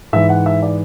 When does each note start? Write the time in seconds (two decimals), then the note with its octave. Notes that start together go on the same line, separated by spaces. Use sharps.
0.13 G#2 E3 E5
0.29 F#5
0.46 E5
0.62 D5